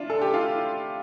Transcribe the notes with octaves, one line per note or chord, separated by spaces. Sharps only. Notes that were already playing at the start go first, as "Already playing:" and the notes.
Already playing: D4 E4 F4
A4
G4
F4